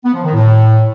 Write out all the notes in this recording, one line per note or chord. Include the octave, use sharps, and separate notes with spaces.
B3
F3
D#3
A2